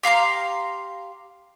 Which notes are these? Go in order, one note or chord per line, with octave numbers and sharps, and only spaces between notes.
G4 F5 A#5 C6